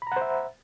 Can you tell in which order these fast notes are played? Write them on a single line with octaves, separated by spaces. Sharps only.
B5 A#5 F#5 C5 E5